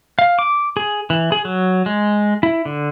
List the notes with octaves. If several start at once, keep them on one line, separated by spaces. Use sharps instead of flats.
F5
D6
G#4
E3
G#4
F#3
G#3
E4
D3